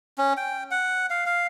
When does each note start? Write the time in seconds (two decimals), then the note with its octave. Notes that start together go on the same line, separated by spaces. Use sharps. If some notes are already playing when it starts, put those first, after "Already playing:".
0.18 C#4
0.37 G5
0.71 F#5
1.10 F5
1.26 F5